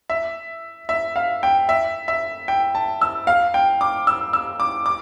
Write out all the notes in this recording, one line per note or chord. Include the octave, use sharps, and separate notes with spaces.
E5
E5
F5
G5
E5
E5
G5
A5
E6
F5
G5
D6
E6
E6
D6
D6